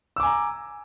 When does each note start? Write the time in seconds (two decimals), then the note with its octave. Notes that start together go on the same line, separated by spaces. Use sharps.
0.16 E6
0.20 D6
0.23 G#5
0.26 A#5